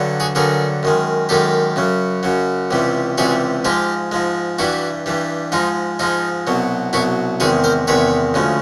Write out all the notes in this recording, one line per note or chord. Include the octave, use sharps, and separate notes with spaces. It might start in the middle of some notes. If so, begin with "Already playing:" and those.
Already playing: G2 D3 F#3
F#4 G#4
G2 D3 F#3 G#4 A#4
F#2 D#3 G#3
F#2 D#3 G#3 G4 A4
F#2 C#3 F#3
F#2 C#3 F#3
C#2 C3 E3 G3
C#2 C3 E3 G3 F#4 G#4
G#2 F3 G#3 F4 G4
G#2 F3 G#3
G2 E3 G3 E4 F#4
G2 E3 G3
G#2 F3 G#3 D#4 F4
G#2 F3 G#3 D#4 F4
C2 B2 F#3
C2 B2 F#3 E4 F#4
E2 C3 D#3 G#3 F#4 G#4
A#4 C5
E2 C3 D#3 G#3 B4 C#5
D2 C#3 F3 G#3